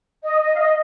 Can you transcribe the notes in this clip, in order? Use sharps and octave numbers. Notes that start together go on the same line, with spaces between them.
D#5
D#5
F5
D#5